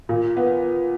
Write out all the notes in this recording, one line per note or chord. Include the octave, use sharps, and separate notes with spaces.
A#2
B3